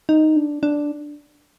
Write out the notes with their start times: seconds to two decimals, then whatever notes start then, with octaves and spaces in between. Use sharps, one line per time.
0.09 D#4
0.36 D4
0.63 D4